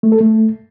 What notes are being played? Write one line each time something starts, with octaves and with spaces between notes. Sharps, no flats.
A3
A4
A3